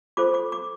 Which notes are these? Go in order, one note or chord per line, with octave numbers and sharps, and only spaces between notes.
F4 A4 C5 D6
D6
D6